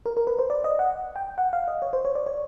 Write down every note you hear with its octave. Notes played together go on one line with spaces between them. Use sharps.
A#4
A#4
B4
C5
D5
D#5
F#5
G5
F#5
F5
D#5
C#5
C5
C#5
D5
C#5